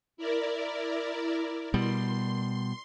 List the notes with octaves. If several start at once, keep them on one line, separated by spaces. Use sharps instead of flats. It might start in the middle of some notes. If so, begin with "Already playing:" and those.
E4 A#4 D5
B2 G3 C6